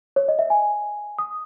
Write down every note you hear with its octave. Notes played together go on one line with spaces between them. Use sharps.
C#5
D#5
E5
G#5
D#6